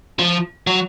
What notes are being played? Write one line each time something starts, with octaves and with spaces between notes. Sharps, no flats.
F3
F#3